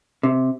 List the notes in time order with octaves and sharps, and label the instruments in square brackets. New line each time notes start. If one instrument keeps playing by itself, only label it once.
[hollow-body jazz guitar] C3